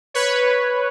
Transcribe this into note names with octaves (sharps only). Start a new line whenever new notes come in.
B4 C#5